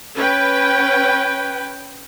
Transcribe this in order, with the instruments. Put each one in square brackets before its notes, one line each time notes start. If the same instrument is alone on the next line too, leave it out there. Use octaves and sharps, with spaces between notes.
[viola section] C#4 B4 G5